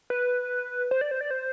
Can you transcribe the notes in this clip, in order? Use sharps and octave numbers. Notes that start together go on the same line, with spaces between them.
B4
C5
D5
C5
D5
C5